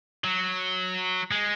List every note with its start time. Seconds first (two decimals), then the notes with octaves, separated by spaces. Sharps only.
0.24 F#3
1.31 G#3